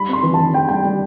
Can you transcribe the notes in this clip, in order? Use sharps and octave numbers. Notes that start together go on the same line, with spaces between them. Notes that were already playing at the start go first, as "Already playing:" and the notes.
Already playing: G3 B5
C4 C6
E3
E3 A5
E3 G5
G3 G5
G3